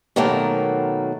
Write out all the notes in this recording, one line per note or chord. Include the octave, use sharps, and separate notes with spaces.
B2 D#3 F#3 A3 A#3